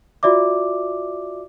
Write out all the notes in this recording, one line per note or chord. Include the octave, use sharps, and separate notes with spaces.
F4 F#4 D5 E5 D6